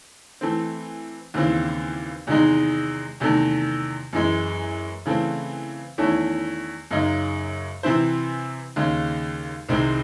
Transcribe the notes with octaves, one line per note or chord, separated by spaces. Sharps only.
E3 A3 C4
D#2 C#3 E3 C4
E2 C3 D#3 G#3 D#4
E2 C3 D#3 A3
F#2 E3 G#3
C#3 E3 A3 C4
E2 D#3 A3 C#4 E4
F#2 C#3 G#3 D#4
C3 E3 C4 E4 C5
D#2 C#3 G#3
C2 C3 D#3 G#3 C4